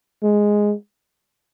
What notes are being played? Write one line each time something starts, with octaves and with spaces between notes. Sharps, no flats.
G#3